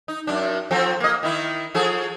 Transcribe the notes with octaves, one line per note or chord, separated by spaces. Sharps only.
D#4
F#2 D4
F3 C4 A4
A#3 D#5
D#3 D#4 E4
F3 G#4 A4